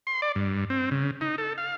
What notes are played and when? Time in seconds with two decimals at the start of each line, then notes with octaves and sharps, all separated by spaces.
0.07 C6
0.22 D5
0.35 G2
0.70 C4
0.91 C#3
1.21 D#4
1.38 A4
1.58 F5